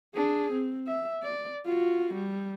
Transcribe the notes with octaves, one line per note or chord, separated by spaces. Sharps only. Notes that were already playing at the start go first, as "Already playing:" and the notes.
D4 G#4
C4
E5
D5
F4 F#4
G3